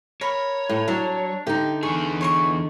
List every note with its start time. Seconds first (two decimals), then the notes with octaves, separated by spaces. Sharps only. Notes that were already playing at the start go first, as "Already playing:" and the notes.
0.21 A#4 C#5 B5
0.69 A2
0.88 F#3 D4
1.47 D3 D#4 G4
1.83 E2 G2 G#4 C#6
2.21 C#5 C6 C#6